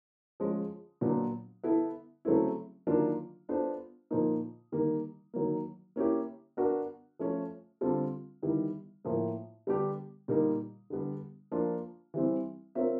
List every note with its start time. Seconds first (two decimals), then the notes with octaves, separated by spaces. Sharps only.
0.40 F3 G#3 C#4
1.01 A#2 F#3 B3 D4
1.64 B3 E4 A4
2.25 C#3 F#3 A3 C4 E4
2.87 D#3 F#3 A#3 D4 F4
3.49 B3 D4 F4 A4 C5
4.11 A#2 F3 A#3 D#4
4.72 D#3 G3 A#3
5.34 D#3 F#3 A#3
5.96 A#3 C#4 E4 G4
6.57 B3 D4 F#4 A#4
7.19 F3 A3 C#4
7.81 D3 G3 C4 F4 A4
8.43 D#3 G3 B3 E4
9.05 A2 F3 A#3
9.67 D3 G3 B3 D4 G4
10.28 A#2 G3 A#3 D#4
10.90 D3 G3 B3
11.52 F3 A#3 D4 F4
12.14 E3 G3 C4
12.75 C4 F4 A#4 C#5 E5